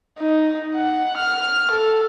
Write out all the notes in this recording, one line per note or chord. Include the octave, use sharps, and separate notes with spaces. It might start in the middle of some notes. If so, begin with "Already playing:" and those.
D#4
F#5
F6
A4